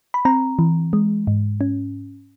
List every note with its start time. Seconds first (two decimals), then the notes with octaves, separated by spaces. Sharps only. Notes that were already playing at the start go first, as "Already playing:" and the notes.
0.14 B5
0.25 C4 A#5
0.59 E3
0.93 G#3
1.27 G#2
1.61 C#4